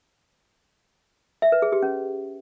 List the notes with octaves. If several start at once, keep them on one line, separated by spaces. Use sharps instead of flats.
E5
B4
G#4
G4
C#4